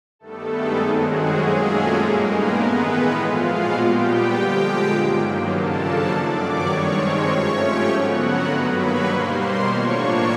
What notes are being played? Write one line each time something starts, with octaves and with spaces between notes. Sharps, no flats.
G2 D#3 G3 A3 B3 A4
G#3 G#4
F#2 D#3 F#3 G#3 C4 F#4
G#3 G#4
A#2 F#3 A#3 C#4
A3 A4
G2 D#3 G#3 A#3 A#4
B3 B4
A2 E3 G#3
A#2 F3 G#3 F4 F5
F#4 F#5
A#2 G3 B3 G4 G5
D3 F3 G#3
G2 D#3 F#3 A#3
F#2 C#3 F3 A#3 D4 A4 A5
A4 A5
G2 D#3 F#3 D5 D6
C#5 C#6
G2 D#3 G#3 C4
C#5 C#6
G#2 F3 A3 C#4
G4 G5
D3 F#3 B3 F#4 F#5
A#4 A#5
G2 D#3 F#3 A#3 B4 B5
C#5 C#6
B2 G3 A#3 C5 C6
A2 F3 A#3 D4 C#5 C#6